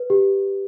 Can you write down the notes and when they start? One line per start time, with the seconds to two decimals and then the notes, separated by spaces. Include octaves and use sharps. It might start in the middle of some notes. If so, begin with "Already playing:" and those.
Already playing: B4
0.10 G4